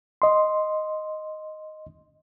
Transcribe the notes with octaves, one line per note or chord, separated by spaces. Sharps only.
D#5 C6